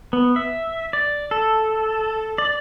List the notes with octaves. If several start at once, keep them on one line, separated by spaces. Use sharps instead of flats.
B3
E5
D5
A4
D5